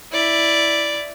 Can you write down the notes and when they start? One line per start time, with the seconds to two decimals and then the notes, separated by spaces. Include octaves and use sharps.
0.13 E4 D5